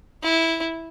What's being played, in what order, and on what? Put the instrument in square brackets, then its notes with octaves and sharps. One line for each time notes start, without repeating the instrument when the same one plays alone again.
[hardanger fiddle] E4